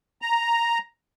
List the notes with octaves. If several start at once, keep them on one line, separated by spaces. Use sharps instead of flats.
A#5